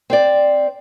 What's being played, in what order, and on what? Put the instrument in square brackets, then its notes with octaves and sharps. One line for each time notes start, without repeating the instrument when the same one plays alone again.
[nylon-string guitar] C4 C5 D5